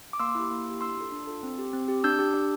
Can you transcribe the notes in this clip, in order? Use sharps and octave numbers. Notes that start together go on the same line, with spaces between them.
D6
A#3 C6 E6
E4 G4
A#3
E4 G4
D4 C6 E6
F4 A4
D4
F4 A4
C4
G4
C4
G4
D4 E6 G6
G4
D4